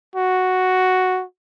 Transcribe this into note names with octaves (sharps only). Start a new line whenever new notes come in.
F#4